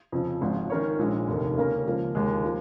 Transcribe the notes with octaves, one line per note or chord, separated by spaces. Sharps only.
F2 C#3 F3
G#1 G#2 F3
D#3 C#4 A#4 C#5
A#1 A#2 G#3
F1 D#2 D#3
C#3 A#3 C#4 A#4
C#2 C#3 F3 A#3
D#2 D#3 G#3
F3 A#3